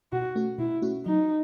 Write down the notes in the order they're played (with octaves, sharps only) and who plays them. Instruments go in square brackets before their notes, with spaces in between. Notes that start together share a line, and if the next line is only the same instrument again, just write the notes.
[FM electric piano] B2 [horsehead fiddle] F#4
[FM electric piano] A3 C#4 F#4
[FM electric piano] B2 [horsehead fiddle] E4
[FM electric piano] A3 C#4 F#4
[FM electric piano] F#3 [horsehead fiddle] D#4